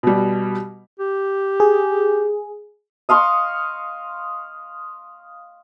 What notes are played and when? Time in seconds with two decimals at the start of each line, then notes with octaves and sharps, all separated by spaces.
0.03 B2 G3
1.00 G4
1.60 G#4
3.09 D#5 F5 C6 C#6